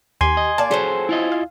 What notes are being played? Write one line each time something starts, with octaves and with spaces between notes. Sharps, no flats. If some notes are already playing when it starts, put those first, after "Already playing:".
D#2 G4 G#5 C6 G#6
D#5
A#3 D5 A5
F3 F#3 C4 G#4 A4 C5
E4 F4 D#5
F5